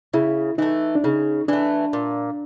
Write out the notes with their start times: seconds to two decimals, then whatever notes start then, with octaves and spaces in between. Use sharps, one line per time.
0.14 C#3 E4
0.58 E3 A3 D#4
0.95 D4
1.04 C#3 D#4
1.48 E3 A3 D4
1.93 A#2